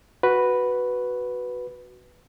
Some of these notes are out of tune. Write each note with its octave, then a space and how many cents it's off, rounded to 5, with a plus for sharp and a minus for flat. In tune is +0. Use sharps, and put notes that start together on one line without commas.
F#4 +0 B4 +0